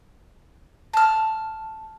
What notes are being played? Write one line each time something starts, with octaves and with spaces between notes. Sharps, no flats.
A5 F6